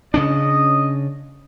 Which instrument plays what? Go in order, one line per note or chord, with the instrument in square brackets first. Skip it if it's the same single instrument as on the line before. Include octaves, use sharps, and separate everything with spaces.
[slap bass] C#3 C#4 D4 [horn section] D#5